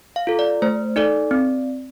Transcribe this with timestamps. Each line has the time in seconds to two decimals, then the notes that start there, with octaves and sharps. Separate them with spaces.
0.16 F5
0.27 F4 A4
0.39 D5
0.62 A3 C5
0.96 D#4 A4 D5
1.31 C4